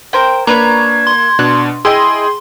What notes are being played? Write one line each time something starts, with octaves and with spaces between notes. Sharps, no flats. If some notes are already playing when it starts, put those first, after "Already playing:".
A#4 C5 G5
A#3 D4 B4 C#5 A#5 G#6
C6
B2 D4 F#6
E4 G#4 D#5 G5 C6